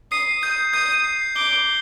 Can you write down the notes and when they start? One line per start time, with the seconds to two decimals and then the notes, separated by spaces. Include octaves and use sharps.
0.11 D#6 C7
0.42 D#6 G6
0.74 D#6 G6
1.04 C7
1.36 D6 G7